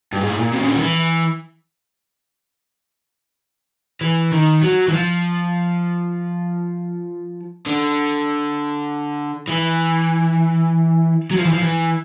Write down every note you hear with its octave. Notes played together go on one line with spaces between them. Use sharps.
G2
G#2
A2
A#2
C3
C#3
D3
D#3
E3
E3
D#3
F#3
E3
F3
D3
E3
F#3
F3
E3
F3
E3